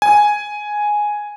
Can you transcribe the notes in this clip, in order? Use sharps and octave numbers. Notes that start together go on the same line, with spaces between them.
G#5